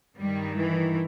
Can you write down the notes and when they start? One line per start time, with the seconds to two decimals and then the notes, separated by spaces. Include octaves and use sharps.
0.19 G2 D#3 G3
0.59 E3